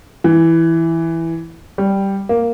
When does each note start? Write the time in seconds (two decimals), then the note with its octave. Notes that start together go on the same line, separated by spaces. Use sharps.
0.24 E3
1.78 G3
2.29 A#3